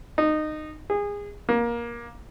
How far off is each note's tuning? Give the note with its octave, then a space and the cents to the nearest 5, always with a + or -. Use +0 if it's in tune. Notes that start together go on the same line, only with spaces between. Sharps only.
D#4 -20
G#4 -25
A#3 +20